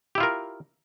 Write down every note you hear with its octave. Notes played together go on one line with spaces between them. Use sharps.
E4 F4 G4 A#4